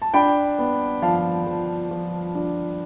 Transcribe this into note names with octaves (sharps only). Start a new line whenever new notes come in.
A5
D4 G5 B5
B3
F3 F5 A5
F3
F3
D4